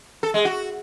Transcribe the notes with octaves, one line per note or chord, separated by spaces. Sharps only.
A4
G#3
F#4